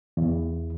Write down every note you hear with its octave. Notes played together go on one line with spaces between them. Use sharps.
E2